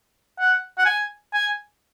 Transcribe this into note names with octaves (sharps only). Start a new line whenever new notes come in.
F#5
F#5
G#5
G#5